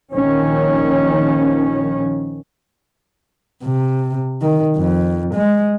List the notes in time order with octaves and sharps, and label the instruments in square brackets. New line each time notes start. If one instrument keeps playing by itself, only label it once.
[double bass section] A#1 D#3 F3 C#4
[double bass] C3
D#3
F2
G#3